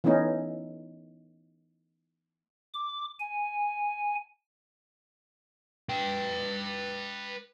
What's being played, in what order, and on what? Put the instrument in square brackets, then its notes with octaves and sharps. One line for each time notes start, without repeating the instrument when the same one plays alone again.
[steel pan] E3 A3 B3 C#4 D#4
[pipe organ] D6
G#5
[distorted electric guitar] B4 G5